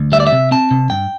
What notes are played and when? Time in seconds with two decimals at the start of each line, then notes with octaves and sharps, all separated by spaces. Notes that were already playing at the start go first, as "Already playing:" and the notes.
Already playing: D2
0.12 G3 E5
0.20 D5
0.27 E5
0.32 C3
0.51 C4 A5
0.71 C3
0.90 G2 G5